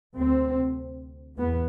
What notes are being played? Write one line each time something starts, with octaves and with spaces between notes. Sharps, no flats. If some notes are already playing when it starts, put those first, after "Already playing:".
D2 C3 C4
E2 B3